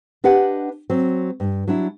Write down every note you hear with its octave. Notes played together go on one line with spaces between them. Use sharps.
D4 G4 B4 D#5 F#5
F#3 C4
G2
F#3 D4 E4